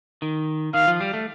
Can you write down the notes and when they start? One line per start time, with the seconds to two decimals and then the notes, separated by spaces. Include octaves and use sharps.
0.22 D#3
0.74 D#3 F5
0.87 F3
1.01 G3
1.13 A3